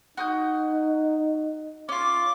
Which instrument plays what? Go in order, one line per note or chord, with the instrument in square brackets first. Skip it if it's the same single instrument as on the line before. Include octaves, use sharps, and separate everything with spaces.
[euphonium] D#4 [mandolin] F#4 D#6 G6
[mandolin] C#4 F4 [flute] D6